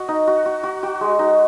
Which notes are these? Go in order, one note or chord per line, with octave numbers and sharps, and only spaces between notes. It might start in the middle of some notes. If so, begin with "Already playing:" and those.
Already playing: F#4 D#5
D#4
F#4
F#4
F#4
F#4
G#3
D#4